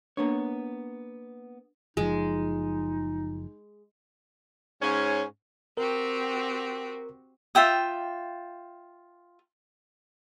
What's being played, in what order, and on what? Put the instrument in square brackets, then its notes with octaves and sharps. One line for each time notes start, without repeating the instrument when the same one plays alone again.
[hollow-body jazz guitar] A#3 B3 C#5 [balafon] D4
[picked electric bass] F#1 F3 [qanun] G#3 [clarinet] D#4
[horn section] G#2 C#4
[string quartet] C4 F#4 G4 [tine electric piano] A#4
[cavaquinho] F4 E5 G5 D#6